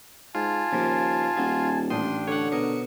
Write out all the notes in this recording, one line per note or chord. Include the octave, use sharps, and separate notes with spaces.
G#2 F4 G#5 A5
D#2 C#3 F3 A#3
D#1 D#4 F#4
A1 D4 G5 C6 D#6
D3 C#5 F#5
B2 A#4 C#5 D#6 C#7